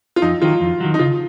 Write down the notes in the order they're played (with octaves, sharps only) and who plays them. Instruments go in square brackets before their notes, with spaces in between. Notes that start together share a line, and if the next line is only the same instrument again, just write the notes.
[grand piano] F4
[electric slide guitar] F2 [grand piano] D#4
[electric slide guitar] D#3 F#3 [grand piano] F4
[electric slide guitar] F2
D#3 F#3
[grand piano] D#4
[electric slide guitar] C#3 [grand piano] F4